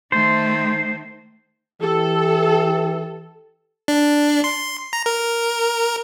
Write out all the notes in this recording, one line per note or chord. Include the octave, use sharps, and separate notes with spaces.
D#3 A3 C5
E3 G4 A4
D4
C6
A#5
A#4